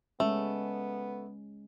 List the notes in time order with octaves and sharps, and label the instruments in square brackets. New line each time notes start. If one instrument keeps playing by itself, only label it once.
[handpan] G#3 C#4 [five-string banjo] A3 [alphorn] B3